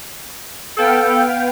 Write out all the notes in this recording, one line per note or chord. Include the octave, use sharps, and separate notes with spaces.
B3 A4 F5 G5